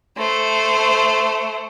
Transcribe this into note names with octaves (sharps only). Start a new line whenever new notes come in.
A3 C5